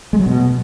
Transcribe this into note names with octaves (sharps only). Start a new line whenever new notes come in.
G#3
F#3
B2